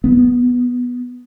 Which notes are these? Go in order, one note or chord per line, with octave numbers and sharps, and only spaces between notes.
B3